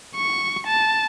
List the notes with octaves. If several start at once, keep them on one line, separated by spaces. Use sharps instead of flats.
C#6
A5